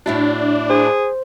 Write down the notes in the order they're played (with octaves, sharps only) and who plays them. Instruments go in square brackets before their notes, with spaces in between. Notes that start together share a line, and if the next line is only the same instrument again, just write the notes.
[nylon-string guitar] A2 E4 F#4 [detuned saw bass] D4
[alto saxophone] G#4 [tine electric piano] C5